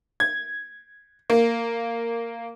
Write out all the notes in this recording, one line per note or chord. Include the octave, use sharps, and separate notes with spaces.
G#6
A#3